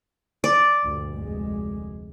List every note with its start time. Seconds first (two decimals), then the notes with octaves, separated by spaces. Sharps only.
0.44 D5
0.84 D2 G2 A#2
1.16 F1 D2 G#3